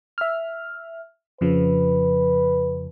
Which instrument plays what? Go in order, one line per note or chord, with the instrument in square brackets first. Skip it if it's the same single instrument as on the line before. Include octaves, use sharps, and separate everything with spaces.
[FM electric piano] E5 F6
[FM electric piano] F2 C#3 F3 [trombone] B4